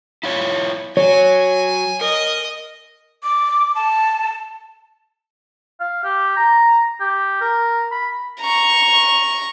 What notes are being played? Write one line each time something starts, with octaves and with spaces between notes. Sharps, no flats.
E4 F4 C#5
F#3 C#5 G#5
A#4 D#5
D6
A5
F5
G4
A#5
G4
A#4
B5
A#5 C#6